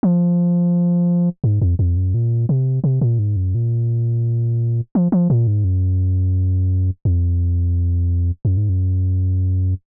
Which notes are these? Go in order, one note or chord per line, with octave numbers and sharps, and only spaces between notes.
F3
G#2
F2
F2
F#2
A#2
C3
C3
A#2
G#2
F#2
A#2
F3
F3
A#2
G#2
F#2
F2
F#2
G#2
F#2